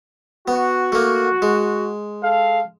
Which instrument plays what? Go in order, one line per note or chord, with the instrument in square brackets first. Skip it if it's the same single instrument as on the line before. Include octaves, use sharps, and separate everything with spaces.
[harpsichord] B3 [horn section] F#4
[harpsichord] A3 A#3
G#3
[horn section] A4 F5